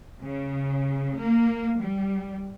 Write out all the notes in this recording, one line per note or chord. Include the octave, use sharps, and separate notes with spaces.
C#3
A#3
G3